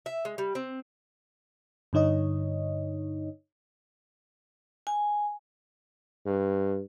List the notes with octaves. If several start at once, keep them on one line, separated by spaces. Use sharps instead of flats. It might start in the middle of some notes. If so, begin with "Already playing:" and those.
E5
G#3
G3
C4
G2 D3 D#4 C#5 D#5
G#5
G2